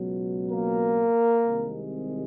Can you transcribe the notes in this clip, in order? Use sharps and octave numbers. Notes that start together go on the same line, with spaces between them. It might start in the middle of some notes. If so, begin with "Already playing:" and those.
Already playing: C#2 B2 F#3
A#3 A#4
C2 C3 D#3 G#3